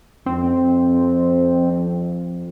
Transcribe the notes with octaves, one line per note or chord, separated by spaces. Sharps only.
F2 C4